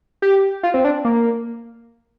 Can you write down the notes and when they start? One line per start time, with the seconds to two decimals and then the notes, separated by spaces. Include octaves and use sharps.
0.22 G4
0.63 F4
0.74 C4
0.85 D4
1.05 A#3